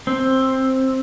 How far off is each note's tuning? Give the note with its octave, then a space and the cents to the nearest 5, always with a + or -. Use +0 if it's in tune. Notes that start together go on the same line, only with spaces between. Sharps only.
C4 +10